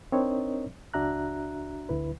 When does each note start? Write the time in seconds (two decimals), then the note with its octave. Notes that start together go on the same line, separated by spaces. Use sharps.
0.12 C4 D4 D#4 A#4 C#5 D#5
0.94 C#2 D4 F#4 E5 A#5 F#6
1.89 D2 D3 E4 B4